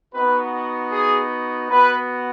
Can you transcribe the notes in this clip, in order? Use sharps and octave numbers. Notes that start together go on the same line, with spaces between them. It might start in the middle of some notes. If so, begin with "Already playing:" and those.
B3 D#4 F#4 B4
G#4
B3 F#4 B4